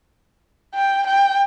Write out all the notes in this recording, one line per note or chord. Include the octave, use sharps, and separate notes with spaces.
G5
G5